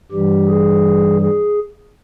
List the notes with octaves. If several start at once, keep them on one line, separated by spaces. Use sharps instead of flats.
G2 E3 G3 G4
G#4
G#4